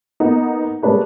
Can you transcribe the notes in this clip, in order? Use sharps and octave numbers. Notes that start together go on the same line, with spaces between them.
A#3 B3 D#4
G3 G#3 A#3 D4 B4 C#5